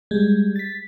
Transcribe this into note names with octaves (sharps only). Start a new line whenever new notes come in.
G3 G#3
A6 B6